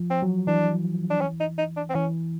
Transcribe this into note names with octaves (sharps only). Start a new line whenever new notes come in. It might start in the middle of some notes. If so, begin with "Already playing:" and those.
Already playing: F3
C4
F#3
E3 D4
D4
C#4
D#4
D#4
D4
C4
E3 C#4